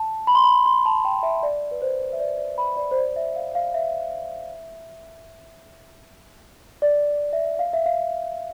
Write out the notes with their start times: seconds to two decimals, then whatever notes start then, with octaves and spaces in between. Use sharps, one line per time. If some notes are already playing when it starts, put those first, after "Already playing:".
Already playing: A5
0.27 B5
0.35 C6
0.44 B5
0.66 C6
0.85 A5
1.05 G5
1.23 E5
1.43 D5
1.71 B4
1.82 C5
2.13 E5
2.20 D5
2.38 D5
2.58 B5
2.77 D5
2.91 C5
2.97 D5
3.16 E5
3.36 F5
3.55 F5
3.74 E5
6.82 D5
7.33 E5
7.59 F5
7.73 E5
7.86 F5